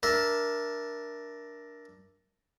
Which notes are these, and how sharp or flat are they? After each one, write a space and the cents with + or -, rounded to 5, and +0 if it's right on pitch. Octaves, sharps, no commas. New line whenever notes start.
D4 +0 A#4 +15 E5 +0